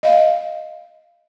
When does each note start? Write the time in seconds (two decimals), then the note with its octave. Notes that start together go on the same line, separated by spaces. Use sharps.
0.03 D#5 F5